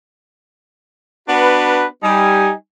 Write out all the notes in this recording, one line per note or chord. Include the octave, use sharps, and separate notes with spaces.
B3 D4 F#4 B4
G3 D#4 G#5